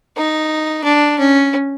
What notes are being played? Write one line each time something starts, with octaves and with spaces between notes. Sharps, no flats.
D#4
D4
C#4